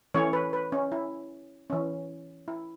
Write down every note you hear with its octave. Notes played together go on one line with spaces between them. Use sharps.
E3 A3 C#4 C#5
B4
B4
C#4
E4
E3 C#4
E4